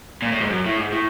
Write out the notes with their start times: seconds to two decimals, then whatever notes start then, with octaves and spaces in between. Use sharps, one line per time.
0.22 A#2
0.32 A2
0.41 G#2
0.50 F#2
0.66 A2
0.78 G#2
0.92 A2